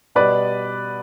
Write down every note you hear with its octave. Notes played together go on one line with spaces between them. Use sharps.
B2 G3 B4 D5